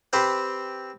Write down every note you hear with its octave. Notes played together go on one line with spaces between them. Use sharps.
C4 G4 B4 C5